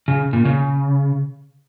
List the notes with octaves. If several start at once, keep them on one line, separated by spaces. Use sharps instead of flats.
C#3
A#2
C#3